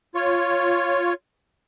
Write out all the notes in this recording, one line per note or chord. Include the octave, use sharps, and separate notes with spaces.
F4 C#5